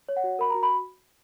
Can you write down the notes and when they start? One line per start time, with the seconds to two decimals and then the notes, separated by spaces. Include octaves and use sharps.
0.09 C#5
0.17 F#5
0.24 F#4
0.39 A#4 B5
0.50 F#4 A#5
0.63 B5